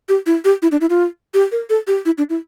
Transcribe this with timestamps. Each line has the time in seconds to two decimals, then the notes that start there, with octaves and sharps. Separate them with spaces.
0.09 G4
0.26 E4
0.45 G4
0.62 E4
0.72 D4
0.81 E4
0.90 F4
1.34 G4
1.52 A#4
1.70 A4
1.87 G4
2.05 E4
2.18 D4
2.30 E4